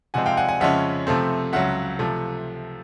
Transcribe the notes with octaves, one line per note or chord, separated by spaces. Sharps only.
C3 F3 G#3 C4 F#5 G#5
F5 G5
F#5 G#5
F#5 G#5
F2 C#3 F3 G#3 C#4 E5 F#5
C3 F3 A3 C4
C#2 C#3 F#3 E5 F#5
C3 F3 A3